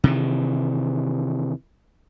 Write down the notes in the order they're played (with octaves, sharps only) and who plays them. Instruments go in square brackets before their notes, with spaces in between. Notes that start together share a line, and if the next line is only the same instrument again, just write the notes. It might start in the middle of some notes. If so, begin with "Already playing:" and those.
[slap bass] C3 D#3 E3